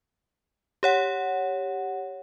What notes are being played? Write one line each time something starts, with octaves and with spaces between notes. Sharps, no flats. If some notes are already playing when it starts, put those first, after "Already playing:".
G4 C#5 F#5